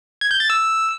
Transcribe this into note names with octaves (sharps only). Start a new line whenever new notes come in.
G#6
G6
A6
E6